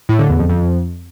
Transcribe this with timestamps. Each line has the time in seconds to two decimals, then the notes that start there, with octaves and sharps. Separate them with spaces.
0.09 A2
0.19 D3
0.29 E2
0.39 F2
0.50 F2